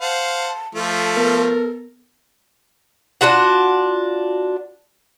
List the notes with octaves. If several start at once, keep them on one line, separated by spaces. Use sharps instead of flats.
C5 F5 F#5 A5
F3 A3 F4 A4
B3 A#4
D4 F4 F#4 F#5